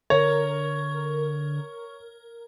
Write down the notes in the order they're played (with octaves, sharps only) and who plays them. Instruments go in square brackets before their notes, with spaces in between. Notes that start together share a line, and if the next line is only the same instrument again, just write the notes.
[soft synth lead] D3 [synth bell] A#4 [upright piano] C#5